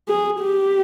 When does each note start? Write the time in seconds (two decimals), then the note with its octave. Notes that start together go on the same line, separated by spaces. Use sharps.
0.09 G#4
0.40 G4